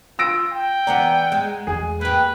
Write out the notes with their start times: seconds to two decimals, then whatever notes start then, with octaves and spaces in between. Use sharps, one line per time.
0.19 F4 E6 A#6 D7
0.52 G5
0.87 E3 B3 D5 F#5 A#5
1.32 G#3
1.67 E2 G#4
2.01 A#3 G4 B4